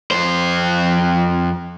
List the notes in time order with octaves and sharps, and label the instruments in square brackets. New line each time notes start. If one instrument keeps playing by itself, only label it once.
[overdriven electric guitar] F2 C5